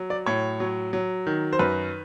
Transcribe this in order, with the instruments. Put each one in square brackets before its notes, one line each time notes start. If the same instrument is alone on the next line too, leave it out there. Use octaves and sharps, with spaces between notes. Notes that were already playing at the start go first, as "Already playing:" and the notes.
Already playing: [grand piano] F#3
D5
A2 C#5
F#3
F#3
D#3
C5
F#2 B4